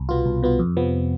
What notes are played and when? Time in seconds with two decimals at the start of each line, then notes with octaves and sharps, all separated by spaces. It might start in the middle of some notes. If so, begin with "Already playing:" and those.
Already playing: C2
0.09 B2 B3 F4
0.25 C2
0.43 B2 B3 F4
0.59 F2
0.77 C3 F3 B3